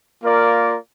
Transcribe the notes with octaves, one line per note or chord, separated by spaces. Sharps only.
A#3 F4 A#4 D5